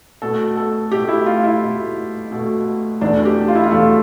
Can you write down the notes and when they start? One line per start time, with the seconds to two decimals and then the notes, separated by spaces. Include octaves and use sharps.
0.22 B2 A3 A4
0.57 A4
0.91 B2 A3 G4
1.09 E4
1.26 F4
1.44 E4
1.62 B2 A3
2.31 B2 A3
3.01 E2 B2 A3 D4
3.25 G4
3.48 F4
3.55 E4
3.64 F4
3.71 E2 B2 A3